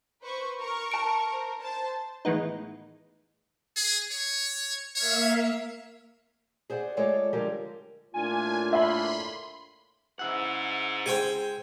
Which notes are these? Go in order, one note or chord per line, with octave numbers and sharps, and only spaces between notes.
B4 C5 C#6
A#4 C#6
A5 D7
A#4 C5
C5 A5
A2 D#3 E3 G#3 B3 D#4
G#4
C#5
A#3 C#5 E5 F5
G#4 C5 D5 F#5
G#3 F4 A4 C#5 D5
D3 F3 G3 G#3 G4 A#4
A2 A#3 D4 F4 G#5
E5 B5 C6
G#2 C#3 E4 F#5
G#3 C5 G5 G#5 D#7